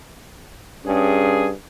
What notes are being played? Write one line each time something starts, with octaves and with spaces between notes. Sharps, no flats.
G2 C#4 G#4